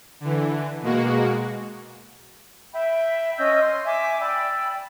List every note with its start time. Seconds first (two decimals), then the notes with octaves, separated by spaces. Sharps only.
0.20 D3 E3
0.82 B2 G#3 A#3 F#4
2.73 E5 G5 B5
3.37 C#4 D#5 E6 G6
3.60 C6
3.85 E5 G#5 D6
4.19 D5 G5 B5 E6